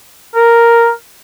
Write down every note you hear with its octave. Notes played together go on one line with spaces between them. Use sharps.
A#4